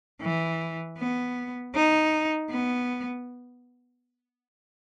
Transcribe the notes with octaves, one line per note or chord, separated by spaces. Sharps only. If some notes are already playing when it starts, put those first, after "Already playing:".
E3
B3
D#4
B3